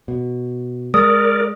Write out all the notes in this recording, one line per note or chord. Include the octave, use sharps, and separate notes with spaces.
B2
G#3 A#4 D5 D#6